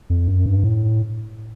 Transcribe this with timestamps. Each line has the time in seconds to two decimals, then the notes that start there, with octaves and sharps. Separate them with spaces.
0.10 F2
0.28 F#2
0.46 G2
0.64 A2